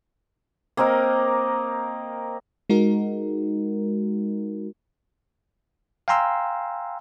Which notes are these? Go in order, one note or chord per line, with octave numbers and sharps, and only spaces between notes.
A#3 C4 A#4 D#5
G#3 D#4 F#4 A#4
F5 G5 G#5 A#5 C6 E6